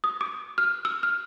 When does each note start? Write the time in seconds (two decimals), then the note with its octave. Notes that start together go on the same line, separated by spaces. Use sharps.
0.04 D#6
0.21 D6
0.58 F6
0.85 E6
1.03 F6